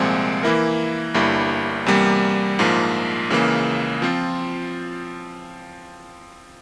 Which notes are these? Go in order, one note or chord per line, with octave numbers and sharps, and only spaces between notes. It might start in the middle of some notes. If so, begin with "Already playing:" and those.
Already playing: C2 A#2 F3 G#3 C4
E3 A#3 E4 A#4
G1 G2 G3 A#3 E4
E2 C3 G3 A#3
A#1 G#2 F3 A#3
C#2 C#3 E3 A#3
F3 C4 F4